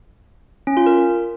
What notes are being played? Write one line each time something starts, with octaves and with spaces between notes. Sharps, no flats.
C#4
F4
A#4